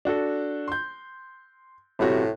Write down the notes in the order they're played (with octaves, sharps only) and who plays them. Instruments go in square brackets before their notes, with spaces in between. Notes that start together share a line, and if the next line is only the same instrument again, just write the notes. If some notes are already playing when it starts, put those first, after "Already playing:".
[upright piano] D4 F#4 A4
C6 G6
[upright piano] G1 C3 F#4 [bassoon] A2